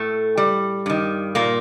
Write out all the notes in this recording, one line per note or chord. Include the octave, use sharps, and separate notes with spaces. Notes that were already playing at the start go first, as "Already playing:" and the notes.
Already playing: A2 A3
G3
G2 D#3
A#2 A#3